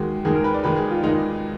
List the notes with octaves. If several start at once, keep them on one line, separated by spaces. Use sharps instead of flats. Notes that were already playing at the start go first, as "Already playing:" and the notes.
Already playing: D#2 D#3 G#3 F#4
D#2 D#3 G#3 G#4
A#4
B4
D5
D#2 D#3 G#3 B4
G#4
F4
D#2 D#3 G#3 D#4